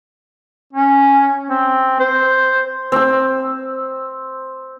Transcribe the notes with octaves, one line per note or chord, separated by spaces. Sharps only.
C#4
C4
C5
C4 E6